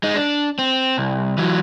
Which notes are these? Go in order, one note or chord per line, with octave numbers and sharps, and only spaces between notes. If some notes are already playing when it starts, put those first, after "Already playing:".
G#3 D#4
D4
C4
C2
E3 F#3